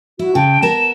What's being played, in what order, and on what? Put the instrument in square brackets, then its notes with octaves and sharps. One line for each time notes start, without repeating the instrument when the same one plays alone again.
[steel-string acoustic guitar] E4 [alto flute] F#4
[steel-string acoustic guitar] C#3 [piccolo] G5 [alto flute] A5
[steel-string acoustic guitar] B3 A#4 [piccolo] E7